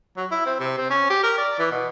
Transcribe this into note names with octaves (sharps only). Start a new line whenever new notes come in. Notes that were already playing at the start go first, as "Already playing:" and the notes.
F#3
E4
C4
C3
C4
C#4
G4
A#4
D5
E3
B2